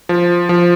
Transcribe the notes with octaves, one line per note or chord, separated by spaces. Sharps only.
F3
F3